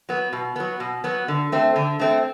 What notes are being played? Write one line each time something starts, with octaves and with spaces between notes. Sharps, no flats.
F#3 B3
B2
F#3 B3
B2
F#3 B3
D3
A3 C4
D3
A3 C4